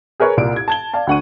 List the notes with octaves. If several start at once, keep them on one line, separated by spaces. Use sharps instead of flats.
G#4 A#4 B4 C#5
C2 A#2 D5 D7
G#6
A5 G#6 G7
D5 F5 A5
D2 D4 F#5 C#6 D#7